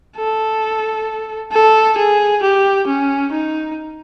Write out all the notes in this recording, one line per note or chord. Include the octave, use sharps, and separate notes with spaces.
A4
A4
G#4
G4
C#4
D#4